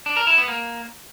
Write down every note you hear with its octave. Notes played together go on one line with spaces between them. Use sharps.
D4
A#4
E4
B3
A#3